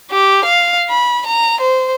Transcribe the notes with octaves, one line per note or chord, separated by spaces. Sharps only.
G4
F5
B5
A#5
C5